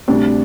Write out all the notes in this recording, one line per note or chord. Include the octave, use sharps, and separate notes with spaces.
D2 C3 G3 D4